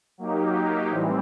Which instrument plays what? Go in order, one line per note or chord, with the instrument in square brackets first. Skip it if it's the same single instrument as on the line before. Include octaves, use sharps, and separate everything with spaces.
[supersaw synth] F#3 A#3 D#4 G4
A2 E3 G3 C4